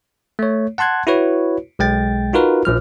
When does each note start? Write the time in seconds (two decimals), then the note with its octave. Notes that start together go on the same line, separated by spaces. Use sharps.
0.39 A3 C#5
0.78 F#5 A5 C6 F#6 G#6
1.07 E4 F#4 B4 C#5
1.79 B1 G#3 G5 A6
2.33 D#4 F4 F#4 A#4 B4
2.65 A#1 F3 F6